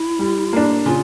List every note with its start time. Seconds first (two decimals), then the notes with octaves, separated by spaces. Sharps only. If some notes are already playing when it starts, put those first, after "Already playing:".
Already playing: E4
0.19 G3
0.53 A#3 D4
0.86 C#3 F4